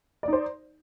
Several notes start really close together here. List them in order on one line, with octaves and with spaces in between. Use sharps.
D5 D#4 C5